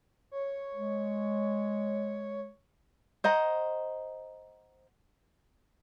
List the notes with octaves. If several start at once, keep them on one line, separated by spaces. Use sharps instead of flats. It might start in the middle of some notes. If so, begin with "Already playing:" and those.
C#5
G#3
C5 D#5 F#5 A#5